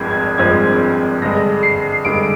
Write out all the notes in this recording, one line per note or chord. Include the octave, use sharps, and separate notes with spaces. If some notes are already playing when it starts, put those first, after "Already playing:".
Already playing: G#1 G2 F3 G#3 C4 G#6
G#6
G#1 G2 F3 G#3 C4 G#6
G2 D3 G#3 A#6
C7
G2 D3 G#3 D7